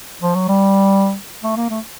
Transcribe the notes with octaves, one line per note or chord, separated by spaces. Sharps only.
F3
F#3
G3
A3
A#3
A3